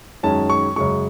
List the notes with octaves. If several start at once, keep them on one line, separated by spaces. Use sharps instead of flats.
F#2 D#3 G#3 C#4 A5
C#6
F#2 C#3 G#3 C#6